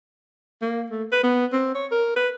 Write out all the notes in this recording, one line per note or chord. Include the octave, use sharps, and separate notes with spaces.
A#3
A3
B4
B3
C4
C#5
A#4
B4